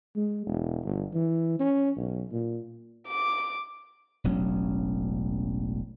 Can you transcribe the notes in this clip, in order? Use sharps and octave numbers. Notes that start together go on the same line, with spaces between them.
G#3
E1
G1
E3
C#4
B1
A#2
D6
E1 A1 F#3 C#4